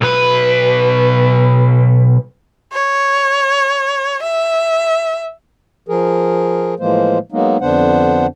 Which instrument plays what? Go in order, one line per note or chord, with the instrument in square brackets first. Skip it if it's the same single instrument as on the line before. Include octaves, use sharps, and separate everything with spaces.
[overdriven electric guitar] B1 B4
[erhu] C#5
E5
[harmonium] F3 G#4 A#4
A2 E3 F3 G#3 A#3 C5
F#3 G#3 A#3 B3 D#4
F2 D3 B3 D4 C5 F#5